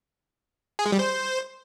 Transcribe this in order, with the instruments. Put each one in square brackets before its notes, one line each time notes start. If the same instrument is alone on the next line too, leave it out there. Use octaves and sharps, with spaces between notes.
[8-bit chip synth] G#4
G#3
G3
C5